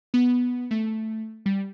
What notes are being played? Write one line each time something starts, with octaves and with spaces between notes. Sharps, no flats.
B3
A3
G3